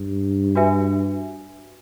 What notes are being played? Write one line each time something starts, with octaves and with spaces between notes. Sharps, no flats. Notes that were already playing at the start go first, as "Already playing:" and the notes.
Already playing: G2
D4 F#4 B4 E5 G#5